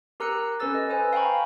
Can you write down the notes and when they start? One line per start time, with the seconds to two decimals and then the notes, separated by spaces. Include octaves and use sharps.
0.20 G4 A#4 A#5 E6 F#6 C#7
0.60 C#4 A4 B4 E6 A6
0.75 D#5
0.90 B4 C5 G#5
1.13 F5 G5 G#5 A#5 B5 C#6